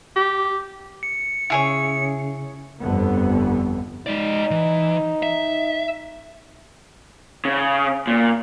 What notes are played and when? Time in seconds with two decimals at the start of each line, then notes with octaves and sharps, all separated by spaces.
0.16 G4
1.03 C#7
1.50 C#3 E4 G#4 C#5
2.82 G1 F2 D3 B3
4.06 G#3 D#4 D5
4.51 E3
5.23 E5
7.45 C#3
8.07 A#2